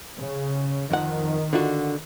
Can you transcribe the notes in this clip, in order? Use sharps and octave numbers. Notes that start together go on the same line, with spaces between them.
C#3
F2 D#3 F#5
D3 F4 F#4